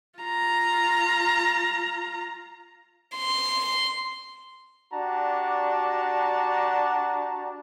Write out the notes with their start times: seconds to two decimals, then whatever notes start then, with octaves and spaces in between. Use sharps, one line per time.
0.20 F4 A#5
3.16 C6
4.94 D4 F#4 G4 D5 A5 A#5